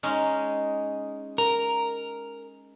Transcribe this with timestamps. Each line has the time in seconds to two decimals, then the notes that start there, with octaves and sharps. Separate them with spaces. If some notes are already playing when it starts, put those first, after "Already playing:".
0.03 G#3 C#4 D#4
1.38 A#4